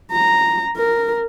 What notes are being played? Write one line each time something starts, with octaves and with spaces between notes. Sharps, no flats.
A#5
A#4